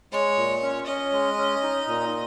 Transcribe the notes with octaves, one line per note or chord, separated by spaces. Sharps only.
G#3 C#5
A#2
C#4
C#4 D#5
G#3
C#4
D#4
A#2